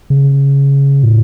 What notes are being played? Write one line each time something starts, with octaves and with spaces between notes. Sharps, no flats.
C#3
A2